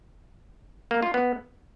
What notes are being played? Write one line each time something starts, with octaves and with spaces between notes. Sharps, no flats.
A#3
F4
B3